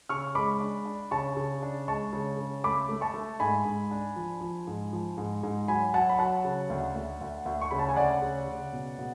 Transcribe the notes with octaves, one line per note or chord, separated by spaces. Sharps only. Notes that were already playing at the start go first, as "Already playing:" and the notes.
C#3 C#6 F6
G#3 B5 D6
D4
D4
C#3 A5 C#6
C#3
D4
G#3 A5 C#6
C#3
C#3
A3 B5 D6
A3
A5 C#6
A3
G#2 G#5 B5
G#2
D4
F3
F3
G#2
F3
G#2
G#2
F#3 G#5 B5
F#3 F#5 A5
B5
F#3 F#5 A5
C#3
D2
D2
D2
D2
C#6
C#3 B5
A5
G#5
D2 D5 F#5
C#3
C#3
B2
B2